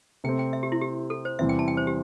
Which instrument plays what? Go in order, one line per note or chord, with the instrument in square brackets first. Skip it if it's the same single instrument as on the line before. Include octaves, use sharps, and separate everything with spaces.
[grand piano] C3 A3 C4 [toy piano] G5
[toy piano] G5
E5
G4
E4
G4
A4
C5
[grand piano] E2 C3 E3 G3 C4 [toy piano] E5
[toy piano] G5
A5
G5
C5
G4